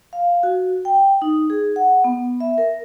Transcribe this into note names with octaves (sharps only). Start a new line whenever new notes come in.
F5
F#4
G5
D#4
G#4
F#5
B3
E5
A#4